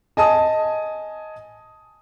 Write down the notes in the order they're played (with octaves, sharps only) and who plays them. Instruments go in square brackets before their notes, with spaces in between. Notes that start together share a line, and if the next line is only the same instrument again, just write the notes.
[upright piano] D#5 G#5 A5 D#6